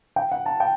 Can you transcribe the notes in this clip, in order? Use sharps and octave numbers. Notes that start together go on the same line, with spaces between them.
G5
F#5
A5
G5